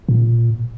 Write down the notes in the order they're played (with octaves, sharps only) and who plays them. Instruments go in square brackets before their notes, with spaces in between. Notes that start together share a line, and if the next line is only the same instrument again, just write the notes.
[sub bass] A#2